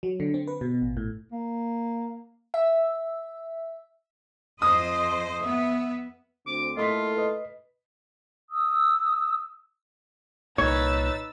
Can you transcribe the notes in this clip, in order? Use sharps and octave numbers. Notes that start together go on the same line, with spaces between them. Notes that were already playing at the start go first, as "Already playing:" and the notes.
F#3
D3
C4
B4
B2
A1
A2
A#3
E5
F2 C5 D#5 D#6
B3 E5
D2 C4 D6
A3 A#3 E4 F4 A4 D#5 C6 B6
B4 D#5
D#6 E6
C2 A#2 D#4 B4 C#5 E6 A6